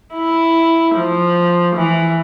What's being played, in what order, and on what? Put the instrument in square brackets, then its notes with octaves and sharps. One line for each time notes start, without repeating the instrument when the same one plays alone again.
[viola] E4
F3
E3